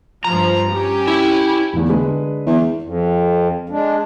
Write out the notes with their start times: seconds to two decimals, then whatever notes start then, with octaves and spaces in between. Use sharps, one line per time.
0.24 G2 F3 A#5
0.71 C#4 G4
1.07 E4
1.73 E1 E2
1.89 D3 G#3 B4
2.46 E2
2.82 F2
3.69 G#3 D4